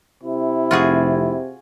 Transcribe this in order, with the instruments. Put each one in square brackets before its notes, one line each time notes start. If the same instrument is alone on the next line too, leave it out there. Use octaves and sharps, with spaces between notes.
[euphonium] C3 [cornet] E4
[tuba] F1 [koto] F4 F#4 G#4